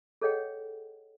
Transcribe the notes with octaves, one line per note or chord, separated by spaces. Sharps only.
G#4 A4 C#5 D#5 F#5 G5